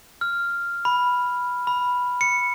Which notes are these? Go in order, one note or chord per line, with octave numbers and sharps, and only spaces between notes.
F6
B5
B5
C#7